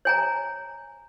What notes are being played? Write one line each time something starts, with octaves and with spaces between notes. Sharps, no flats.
C#5 G#5 A#5